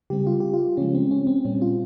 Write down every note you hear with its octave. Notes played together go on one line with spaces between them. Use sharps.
C#3 G3 C4 G4
F4
G4
F4
C#3 F3 G#3 C#4
C4
C#4
C4
A#2 G3 C4 C#4
F4